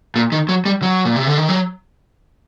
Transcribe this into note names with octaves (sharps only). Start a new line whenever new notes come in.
A#2
D#3
F#3
G3
F#3
A#2
C3
D3
D#3
F#3